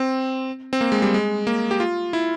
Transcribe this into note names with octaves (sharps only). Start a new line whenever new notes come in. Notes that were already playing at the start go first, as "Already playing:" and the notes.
Already playing: C4
C4
A#3
G#3
G3
G#3
A#3
G4
F4
E4